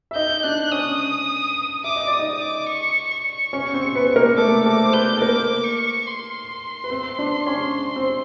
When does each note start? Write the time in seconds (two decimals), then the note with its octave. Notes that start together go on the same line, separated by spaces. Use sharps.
0.11 E5
0.16 D#4 D#5 G6
0.43 D4 D5 F#6
0.72 C#4 C#5 D#6
1.84 E5 D6
1.96 D#5
2.07 D5
2.12 D#6
2.19 D#4 D#5
2.41 D6
2.69 C#6
3.10 C#6
3.53 C#4 C#5
3.74 C4 C5
3.95 B3 B4
4.16 A#3 A#4
4.38 A3 A4 D6
4.65 A3 A4 D6
4.84 C5
4.94 B3 B4 G6
5.17 A4
5.21 A#3 A#4 D6
5.64 C#6
6.06 C6
6.84 B4
6.90 C4 C5
7.19 D4 D5
7.47 C#4 C#5
7.96 C4 C5